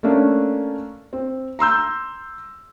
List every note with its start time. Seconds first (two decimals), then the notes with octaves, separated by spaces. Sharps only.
0.03 A3 A#3 C#4 D4
1.13 C4
1.59 A#5 C6 E6 G6